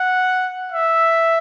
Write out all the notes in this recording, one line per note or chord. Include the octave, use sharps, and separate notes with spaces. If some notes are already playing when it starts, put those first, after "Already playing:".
Already playing: F#5
E5